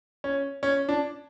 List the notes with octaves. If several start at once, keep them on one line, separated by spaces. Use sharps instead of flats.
C#4
C#4
D4